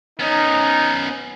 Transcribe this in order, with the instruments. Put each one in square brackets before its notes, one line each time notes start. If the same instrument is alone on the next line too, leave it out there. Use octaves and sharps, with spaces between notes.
[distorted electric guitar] B3 C#4 [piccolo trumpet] D#4